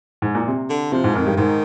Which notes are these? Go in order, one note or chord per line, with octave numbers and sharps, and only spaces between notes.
G#2
A#2
C3
D3
C3 F3
G#2
F2 D#3
G2
G#2 D#3